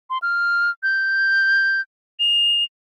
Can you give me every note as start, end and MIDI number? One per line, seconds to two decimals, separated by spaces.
0.10 0.18 84
0.22 0.71 89
0.83 1.81 91
2.20 2.64 101